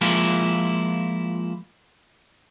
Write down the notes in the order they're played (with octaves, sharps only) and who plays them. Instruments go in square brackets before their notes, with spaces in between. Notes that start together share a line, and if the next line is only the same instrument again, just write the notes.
[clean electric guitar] F3 G#3 A#3 E4 F4